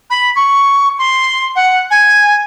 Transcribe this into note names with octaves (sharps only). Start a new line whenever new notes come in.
B5
C#6
C6
F#5
G#5